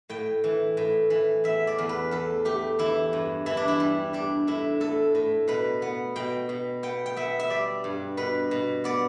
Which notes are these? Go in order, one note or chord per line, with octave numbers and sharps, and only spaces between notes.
A2 G5
E3
A2
E3
E2 E5
D5
E2
B4
E2 A4
A3 G4
E3 E4
G2
E3 E4
D4
E4
G3
G3 D4
A2 E4
A2 A4
A2
B2 B4
B3
B2 G5
B2
B3 G5
G5
B3 E5
E5
G3 D5
G2
B2 B4
B2
B3 D5